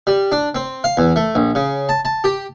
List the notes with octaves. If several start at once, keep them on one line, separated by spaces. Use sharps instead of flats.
G3
D4
C4
F5
E2
A3
A#1
C#3
A5
A5
G4